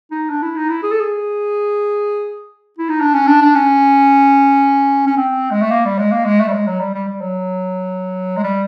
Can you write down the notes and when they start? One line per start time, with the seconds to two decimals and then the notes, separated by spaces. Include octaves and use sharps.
0.11 D#4
0.29 D4
0.42 E4
0.56 D#4
0.70 E4
0.83 G#4
0.91 A4
1.00 G#4
2.78 E4
2.89 D#4
3.01 D4
3.14 C#4
3.27 D4
3.42 D4
3.55 C#4
5.07 C#4
5.17 C4
5.51 G#3
5.61 A3
5.71 A#3
5.85 G3
5.98 G#3
6.12 A#3
6.25 G#3
6.40 A3
6.48 G3
6.53 G#3
6.67 F#3
6.80 G3
6.94 G3
7.08 G3
7.21 F#3
8.37 G#3
8.44 G3